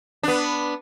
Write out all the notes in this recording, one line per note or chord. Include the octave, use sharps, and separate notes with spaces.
B3 D4